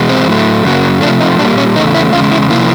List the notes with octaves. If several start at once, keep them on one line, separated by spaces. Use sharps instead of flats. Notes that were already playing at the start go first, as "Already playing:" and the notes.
Already playing: E2 B2 G#3
C4
A2 F#3 A3
F#2 C#3 F#3 A#3
C3 F3 A3 D4
D#4
A#2 G3 A#3 D4
C#4
E2 C#3 A3 D#4
E4
E2 C#3 G#3 F4
E4
C3 F3 A#3 E4